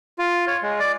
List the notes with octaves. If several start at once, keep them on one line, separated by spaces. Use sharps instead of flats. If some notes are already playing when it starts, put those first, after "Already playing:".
F4
C#5
G#3
D5